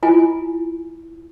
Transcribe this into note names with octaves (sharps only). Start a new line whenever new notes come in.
E4 F4 G#5